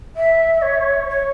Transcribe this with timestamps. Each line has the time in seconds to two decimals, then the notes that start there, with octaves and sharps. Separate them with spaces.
0.16 E5
0.62 C#5
1.08 C#5